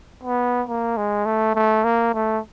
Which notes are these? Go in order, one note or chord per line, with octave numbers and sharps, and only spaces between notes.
B3
A#3
G#3
A3
A3
A#3
A3